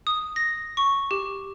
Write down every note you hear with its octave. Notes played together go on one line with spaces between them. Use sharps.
D#6
A#6
C#6
G4